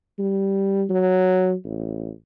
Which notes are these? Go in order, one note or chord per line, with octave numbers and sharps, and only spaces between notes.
G3
F#3
A1